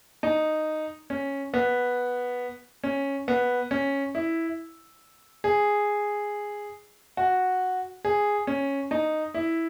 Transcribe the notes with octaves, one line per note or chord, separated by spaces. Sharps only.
D#4
C#4
B3
C#4
B3
C#4
E4
G#4
F#4
G#4
C#4
D#4
E4